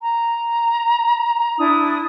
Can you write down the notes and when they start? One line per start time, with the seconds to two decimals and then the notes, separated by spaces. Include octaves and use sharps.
0.02 A#5
1.58 D4 E4 D#6